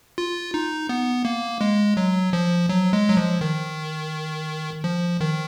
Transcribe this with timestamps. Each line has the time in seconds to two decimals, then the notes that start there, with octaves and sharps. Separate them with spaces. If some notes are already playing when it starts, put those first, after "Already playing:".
0.18 F4
0.54 D#4
0.89 B3
1.25 A#3
1.61 G#3
1.97 F#3
2.33 F3
2.69 F#3
2.93 G#3
3.09 F#3
3.17 F3
3.41 D#3
4.84 F3
5.21 D#3